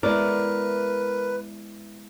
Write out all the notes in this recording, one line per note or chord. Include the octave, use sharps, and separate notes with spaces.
G#3 B3 E4 A#4 B4 D5